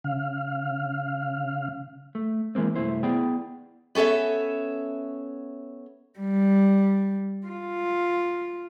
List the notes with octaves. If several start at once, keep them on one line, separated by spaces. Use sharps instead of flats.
C#3 F5
A3
E3 G#3 A#3 C4
C2 F#2 A3 E4 C5
B3 E4 G#4 D5 G5
B3 C#4 A4 C#5 E5
G3
F4